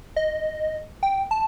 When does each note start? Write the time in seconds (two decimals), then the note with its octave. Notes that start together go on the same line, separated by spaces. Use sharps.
0.16 D#5
1.03 G5
1.31 A5